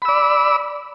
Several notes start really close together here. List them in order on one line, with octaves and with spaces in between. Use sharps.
B5 E6 D5